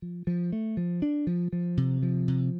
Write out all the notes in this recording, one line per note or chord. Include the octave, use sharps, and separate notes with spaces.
F3
F3
A3
F3
D4
F3
F3
C3
F3
C3